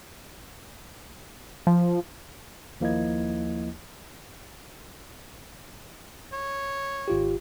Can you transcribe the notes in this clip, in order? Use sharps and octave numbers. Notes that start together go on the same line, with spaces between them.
F3
D#2 F3 A#3 E4 D#5 G#6
C#5
G#1 F4 G4